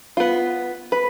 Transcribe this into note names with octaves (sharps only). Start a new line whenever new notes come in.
B3 F4
B4